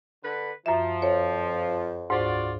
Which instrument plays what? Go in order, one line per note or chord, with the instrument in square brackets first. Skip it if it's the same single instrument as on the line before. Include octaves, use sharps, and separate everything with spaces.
[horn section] D3 B4
[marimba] F#2 E5 [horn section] F3
[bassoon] F2 [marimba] C#5
[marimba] D2 G#2 C5 [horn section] F4 F#4 D5